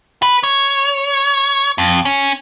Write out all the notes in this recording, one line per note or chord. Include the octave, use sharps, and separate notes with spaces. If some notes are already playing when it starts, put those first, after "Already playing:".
B4
C#5
F2
C#4